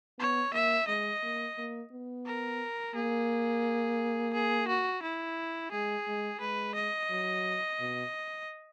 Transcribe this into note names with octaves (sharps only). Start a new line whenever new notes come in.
B3 C#5
A#3 E5
G#3 D#5
A#3
A#3
B3
A#4
A#3 G#4
G#4
F#4
E4
G#3 G#4
G#3
G#3 B4
D#5
F#3
B2